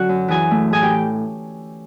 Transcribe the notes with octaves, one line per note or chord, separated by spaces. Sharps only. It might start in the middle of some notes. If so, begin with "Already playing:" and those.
Already playing: D3 F#3 C#4 F#4 C#5 F#5
F#2
E3 G#4 G#5
A3
A2 G#4 G#5
G4 G5